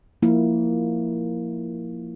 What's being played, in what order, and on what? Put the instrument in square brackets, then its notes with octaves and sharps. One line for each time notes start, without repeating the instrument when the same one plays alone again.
[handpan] F3 A#3 E4